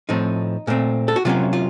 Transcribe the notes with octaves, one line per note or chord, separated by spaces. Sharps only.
A2 F3 A3 C4 D#4
A#2 A3 C4
A4
F#4
C3 F#3 A#3 C#4 F4
F4